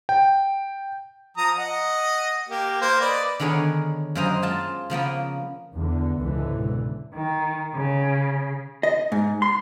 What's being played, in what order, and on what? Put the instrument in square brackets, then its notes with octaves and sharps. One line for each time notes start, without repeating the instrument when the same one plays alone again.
[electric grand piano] G5
[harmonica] F3 A#5 D#6
D#5 F#5
A#3 G4
A#3 C5
B4 D5 D#5
[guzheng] D3 D#3 B3 G#4 A#4 C#5
F#2 F#3 A#3 C5 D#5 A#5
G#3 F4 A5
C#3 F3 A#3 B3
[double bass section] E2 D3
C#2 G#2 B2 D3 E3
[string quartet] D#3
C#3
[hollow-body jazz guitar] D#5
G#2
C6